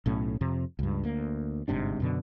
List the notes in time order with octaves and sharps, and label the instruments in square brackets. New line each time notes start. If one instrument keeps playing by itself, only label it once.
[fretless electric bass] B1 A2 C#4
F2 C3
C#2 G2
D2 A#3
G1 G#2 C3 D4
F#2 B2 D3